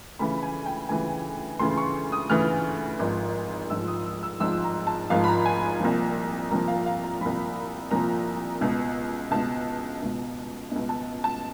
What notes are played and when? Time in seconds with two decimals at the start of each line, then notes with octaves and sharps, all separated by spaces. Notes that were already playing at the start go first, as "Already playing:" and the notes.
0.19 D2 C#3 E3 B5
0.43 G#5
0.66 G5
0.89 D2 C#3 E3 G#5
1.59 D2 C#3 E3 C6
1.77 C#6
2.12 D#6
2.30 D2 C#3 E3 F6
2.99 G#1 G#2 F3
3.70 G#1 G#2 F3 E6
3.88 D#6
4.05 E6
4.23 E6
4.40 G#1 G#2 F3 E6
4.64 A#5
4.87 A5
5.10 G#1 G#2 F3 F5
5.24 B5
5.28 A#5
5.46 G#5
5.80 C2 A#2 F3
6.51 C2 A#2 F3 A#5
6.68 F5
6.86 F5
7.03 A#5
7.21 C2 A#2 F3 B5
7.91 C2 A#2 F3 A#5
8.61 C#2 B2
9.31 C#2 B2 A5
10.02 C#2 B2
10.72 C#2 B2
10.89 A5
11.24 A5